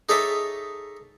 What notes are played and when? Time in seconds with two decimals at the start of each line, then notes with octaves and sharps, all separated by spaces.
0.09 D#4 G#4 A4 C#5 E5 D6